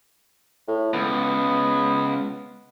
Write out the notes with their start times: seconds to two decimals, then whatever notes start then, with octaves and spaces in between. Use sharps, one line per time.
0.68 A2
0.94 C#2 B3